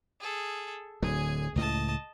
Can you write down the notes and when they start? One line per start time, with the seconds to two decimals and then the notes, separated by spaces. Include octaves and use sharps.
0.20 G#4 A4
1.02 D1 D3 F#3 G#4 G#5
1.56 C#2 A2 D#5 A5